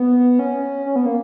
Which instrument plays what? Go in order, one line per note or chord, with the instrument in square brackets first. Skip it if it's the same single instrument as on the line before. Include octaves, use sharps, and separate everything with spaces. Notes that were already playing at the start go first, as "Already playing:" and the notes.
Already playing: [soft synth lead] B3
C#4
C#4
B3
A#3